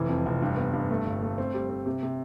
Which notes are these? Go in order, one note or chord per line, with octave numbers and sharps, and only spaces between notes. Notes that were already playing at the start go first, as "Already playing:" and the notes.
Already playing: F1 E3
F2
F1
G2
B3
G2
A3
G1
A3
C4
G3
C4
C3
C3